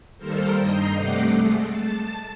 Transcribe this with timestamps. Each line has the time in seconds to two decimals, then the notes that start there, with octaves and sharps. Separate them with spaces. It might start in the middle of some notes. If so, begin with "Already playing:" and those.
0.18 D#3 G3 A#3 A4 A#4 C5
0.57 G2 D#5 A#5 G6 C7
0.97 C3 G3 A3 F#5 D6 C7
1.34 G#3 A3
1.65 A5